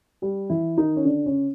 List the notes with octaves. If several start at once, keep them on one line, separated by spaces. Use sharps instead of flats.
G3 G4
E3 E4
D#3 D#4
C#4
D3 D4
C#3 C#4